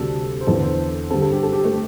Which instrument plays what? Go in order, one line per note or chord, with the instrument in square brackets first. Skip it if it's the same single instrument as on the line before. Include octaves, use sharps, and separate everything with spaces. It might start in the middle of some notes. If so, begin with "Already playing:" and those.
Already playing: [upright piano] D2 C3 G3 D4 [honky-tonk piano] A4
[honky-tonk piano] C5
[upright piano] E2 D3 C4 E4 [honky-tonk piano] A4
[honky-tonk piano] C5
[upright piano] G2 D3 G3 C4 [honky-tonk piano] A4
[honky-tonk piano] A4
G4
A4
G4
A3